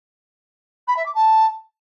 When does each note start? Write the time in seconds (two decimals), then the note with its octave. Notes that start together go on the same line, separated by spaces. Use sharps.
0.87 B5
0.96 E5
1.05 D6
1.14 A5